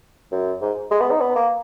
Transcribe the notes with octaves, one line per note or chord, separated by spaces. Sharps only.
F#2
G#2
G#3
B3
D#4
B3
A#3